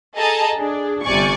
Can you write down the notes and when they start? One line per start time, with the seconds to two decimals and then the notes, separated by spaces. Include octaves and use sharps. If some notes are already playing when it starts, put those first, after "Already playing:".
0.16 G#4 A4 D#5 A5 A#5
0.57 D4 G#4
1.04 G1 C3 D5 G#5 C#6